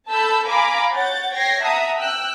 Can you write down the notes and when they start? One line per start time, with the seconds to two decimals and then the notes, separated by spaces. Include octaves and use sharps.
0.10 A4 A5 B5 E6 G6
0.48 F5 G#5 A#5 B5 D6
0.94 C#5 F#5 G6 A6
1.34 C#5 G5 G#6 A#6 C7
1.62 E5 F#5 A5 A#5 D#6
1.99 G5 E6 F#6